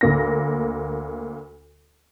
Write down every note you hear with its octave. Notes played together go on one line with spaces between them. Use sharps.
D2 A#3 A#6